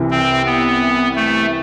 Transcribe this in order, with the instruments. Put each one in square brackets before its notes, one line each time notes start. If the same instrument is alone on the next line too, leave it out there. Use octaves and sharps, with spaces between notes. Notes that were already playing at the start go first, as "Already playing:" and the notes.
Already playing: [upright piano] C2 C3 E3
[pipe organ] C4
B3
A3